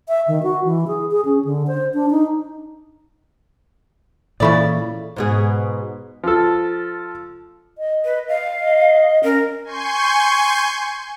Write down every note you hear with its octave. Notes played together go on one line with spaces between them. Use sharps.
E5
D#3
F#4
E3
G#4
G#4
C#4
D3
C5
D4
D#4
A#2 C#3 E3 E4 F4 A4 D5 C#6
G#2 B2 G#4
F3 A4
D#5
B4
F5
D#5
C#4 A#4
G#5 C6 C#6 G6